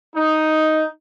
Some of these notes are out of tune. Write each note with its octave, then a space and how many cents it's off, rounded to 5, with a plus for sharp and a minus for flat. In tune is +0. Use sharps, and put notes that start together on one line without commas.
D#4 +5